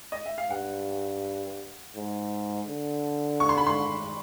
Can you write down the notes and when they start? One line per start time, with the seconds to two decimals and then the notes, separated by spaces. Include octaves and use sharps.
0.12 D#5
0.26 E5
0.38 F5
0.50 G2 F#5
1.96 G#2
2.68 D3
3.40 C#6
3.49 C6
3.58 B5
3.67 C6